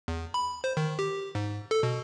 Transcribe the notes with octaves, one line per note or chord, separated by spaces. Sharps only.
E2
B5
C5
D#3
G4
G#2
A4
B2